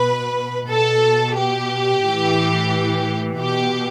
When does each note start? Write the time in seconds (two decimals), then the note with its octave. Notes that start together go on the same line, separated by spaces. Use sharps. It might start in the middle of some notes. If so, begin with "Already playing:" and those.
Already playing: B2 B4
0.69 B2 A4
1.37 G4
2.03 A2 E3
3.38 B2 G4